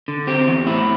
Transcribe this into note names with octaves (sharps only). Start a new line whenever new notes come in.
D3
C4 G4
E2
A2 E4